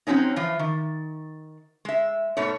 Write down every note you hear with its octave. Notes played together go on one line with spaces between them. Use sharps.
F3 F#3 C4 C#4 D#4
E3 F3 F4
D#3
G#3 E5
G#2 B2 A3 C#5